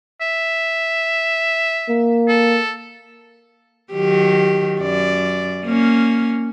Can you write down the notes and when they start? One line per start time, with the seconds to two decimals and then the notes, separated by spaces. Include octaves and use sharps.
0.21 E5
1.89 A#3
2.28 A4
3.92 D#3 F#3 G4
4.79 F#2 D5
5.65 A#3 C#4